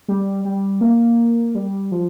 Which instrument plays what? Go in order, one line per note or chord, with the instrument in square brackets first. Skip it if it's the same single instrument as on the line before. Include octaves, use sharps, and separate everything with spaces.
[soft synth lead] G3
G3
A#3
G3
F3